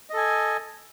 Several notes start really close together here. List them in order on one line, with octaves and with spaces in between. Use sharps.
D#5 A4 G#5